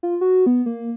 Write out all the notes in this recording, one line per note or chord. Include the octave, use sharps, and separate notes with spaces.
F4
F#4
B3
A#3